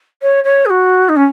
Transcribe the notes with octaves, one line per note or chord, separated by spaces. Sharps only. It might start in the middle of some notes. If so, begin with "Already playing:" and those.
C#5
C#5
G#4
F#4
D#4
C#4